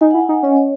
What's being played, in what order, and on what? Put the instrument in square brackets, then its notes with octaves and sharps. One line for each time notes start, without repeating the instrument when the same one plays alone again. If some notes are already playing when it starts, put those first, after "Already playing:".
[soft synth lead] D#4 [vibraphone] G#5
[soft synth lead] E4 [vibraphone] F#5
[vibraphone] G#5
[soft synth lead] D#4
[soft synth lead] C#4 [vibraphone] D#5
[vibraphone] C#5